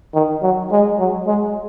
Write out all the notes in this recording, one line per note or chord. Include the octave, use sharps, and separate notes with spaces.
D#3
F#3
G#3
F#3
G#3